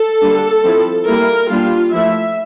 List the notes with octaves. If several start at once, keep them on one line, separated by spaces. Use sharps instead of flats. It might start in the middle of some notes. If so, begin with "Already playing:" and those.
Already playing: A4
D3 G3 A#3 D4
F3 C4 E4
G3 A#3 E4 A#4
G3 A#3 D4 F4
F3 A3 E4 E5